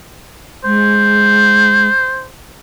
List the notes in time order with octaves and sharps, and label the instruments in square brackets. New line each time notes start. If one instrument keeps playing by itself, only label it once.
[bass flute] G#3 [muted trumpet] C5